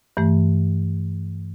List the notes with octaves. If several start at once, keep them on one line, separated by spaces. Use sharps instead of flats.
G2 E3 A3